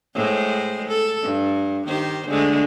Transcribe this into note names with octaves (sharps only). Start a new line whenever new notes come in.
A2 G#3 C5
A4
G2
D#3 G4 C5
D3 G#3 A3